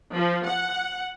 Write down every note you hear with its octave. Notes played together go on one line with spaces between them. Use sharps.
F3
F#5